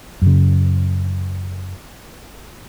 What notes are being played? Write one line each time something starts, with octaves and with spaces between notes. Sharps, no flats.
F#2 C#3